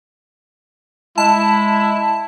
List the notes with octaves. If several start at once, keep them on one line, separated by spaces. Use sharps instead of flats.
G#3 E4 A5